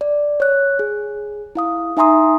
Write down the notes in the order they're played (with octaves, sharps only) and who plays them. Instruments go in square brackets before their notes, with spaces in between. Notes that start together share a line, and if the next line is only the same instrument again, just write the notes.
[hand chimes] D5
C#5 F#6
G#4
E4 F5 D#6
D#4 E5 G#5 A#5 C6 D#6